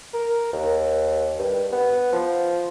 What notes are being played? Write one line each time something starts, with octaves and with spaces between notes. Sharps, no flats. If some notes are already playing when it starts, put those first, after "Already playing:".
A#4
D#2
G2
B3
F3